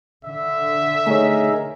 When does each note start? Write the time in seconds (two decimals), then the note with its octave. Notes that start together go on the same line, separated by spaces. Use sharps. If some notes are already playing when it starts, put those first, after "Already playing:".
0.25 D3 E5
1.07 A3 D#4 G#4 A#4 C#5